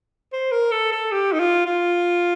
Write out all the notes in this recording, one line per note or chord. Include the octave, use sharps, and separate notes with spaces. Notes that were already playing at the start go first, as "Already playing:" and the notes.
C5
A#4
A4
A4
G4
D#4
F4
F4